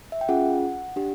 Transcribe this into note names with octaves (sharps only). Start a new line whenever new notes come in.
E5
G5
C#4 F4 G#4 F#5
D4 G4